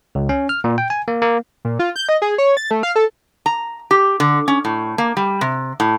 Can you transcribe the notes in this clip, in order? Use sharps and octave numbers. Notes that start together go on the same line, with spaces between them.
C#2
C#4
F6
A#2
G5
G#5
A#3
A#3
A#2
F4
G6
D#5
G#4
C#5
A6
A3
F5
A4
A#5
G4
D3
C#4
A2
A#3
G3
C3
A2